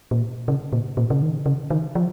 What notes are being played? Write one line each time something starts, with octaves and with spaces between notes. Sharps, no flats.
A#2
C#3
A#2
A#2
C#3
D#3
C#3
D#3
F3